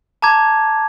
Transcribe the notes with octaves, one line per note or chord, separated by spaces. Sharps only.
A5 A#5 D6 G#6